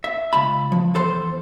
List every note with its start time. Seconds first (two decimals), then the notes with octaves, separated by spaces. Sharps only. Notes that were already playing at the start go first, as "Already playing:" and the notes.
0.04 E5
0.33 C#2 A5 B5
0.72 F3
0.94 E2 A4 C5 C6